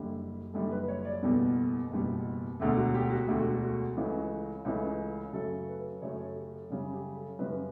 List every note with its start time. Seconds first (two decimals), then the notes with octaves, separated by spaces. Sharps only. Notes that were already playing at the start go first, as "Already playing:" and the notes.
Already playing: F#1 F#2 D3 G3 G4
0.54 F#1 F#2 D3 G3 A4
0.71 B4
0.88 C#5
1.05 D5
1.22 F#1 E2 B2 G3 A4
1.90 F#1 E2 B2 G3
2.60 E1 D2 D3 A3
2.77 F#4
2.94 G4
3.10 F#4
3.28 E1 D2 D3 A3 G4
3.39 F#4
3.63 F#4
3.97 C#2 C#3 E3 A3
4.65 C#2 C#3 E3 A3
5.33 F#2 C#3 F#3 A3 A4
5.68 B4
6.02 F#2 C#3 F#3 A3 C#5
6.20 A4
6.36 G4
6.54 A4
6.70 F#2 C#3 G3
6.94 G4
7.16 A4
7.39 F#2 C#3 G3 B4